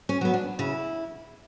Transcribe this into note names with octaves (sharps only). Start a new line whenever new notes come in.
C#4
F#3 B3
D4
C#3 E4